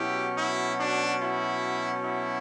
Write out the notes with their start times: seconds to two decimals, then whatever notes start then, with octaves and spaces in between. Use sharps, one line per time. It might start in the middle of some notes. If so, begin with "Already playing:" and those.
Already playing: B2 F#3 C#4 E4 G4
0.37 E4
0.78 D4
1.20 E4
2.03 E4